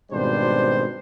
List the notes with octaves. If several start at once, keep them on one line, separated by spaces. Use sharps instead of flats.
G#1 B2 G3 D4 C5